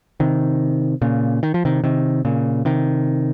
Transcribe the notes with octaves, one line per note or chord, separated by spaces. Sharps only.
C3 D#3
A#2 C#3
D#3
F3
C3 D#3
C3 D#3
A#2 C#3
C3 D#3